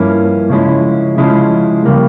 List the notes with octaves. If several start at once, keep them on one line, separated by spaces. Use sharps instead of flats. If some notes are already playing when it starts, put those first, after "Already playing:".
Already playing: G2 F3 A#3 C#4 E4
C#3 F3 G#3 C#4 E4
C#3 F3 G#3 C#4 E4
C#3 G3 A#3